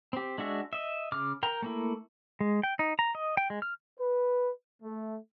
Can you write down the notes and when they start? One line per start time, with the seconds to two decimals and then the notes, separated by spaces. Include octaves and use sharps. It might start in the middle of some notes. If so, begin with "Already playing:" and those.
0.13 C4 G4
0.38 G#3 D4 F#4 E5
0.73 D#5 E5
1.12 C#3 D6 F6
1.43 A#4 G5 A#5
1.62 A3 A#3 E4
2.41 G#3
2.63 G5
2.79 D#4
2.99 A#5
3.15 D#5
3.37 G5
3.50 G#3
3.62 F6
3.99 B4
4.82 A3